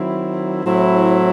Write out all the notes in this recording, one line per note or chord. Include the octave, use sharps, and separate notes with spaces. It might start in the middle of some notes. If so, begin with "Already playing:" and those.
Already playing: D#3 F#3 C4 E4
A2 F#3 C4 E4